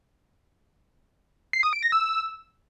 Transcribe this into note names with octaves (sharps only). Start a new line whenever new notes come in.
C7
D#6
D7
A#6
E6